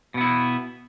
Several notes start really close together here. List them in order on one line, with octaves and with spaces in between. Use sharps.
B2 B3 E4